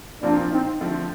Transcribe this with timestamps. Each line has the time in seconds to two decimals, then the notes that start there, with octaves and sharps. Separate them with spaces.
0.22 A#2 F3 A#3 C4 D4 F4
0.52 C4 D#4
0.81 D3 F3 A3 C4